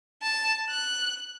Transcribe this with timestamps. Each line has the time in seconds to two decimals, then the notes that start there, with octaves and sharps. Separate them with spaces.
0.22 A5
0.69 F#6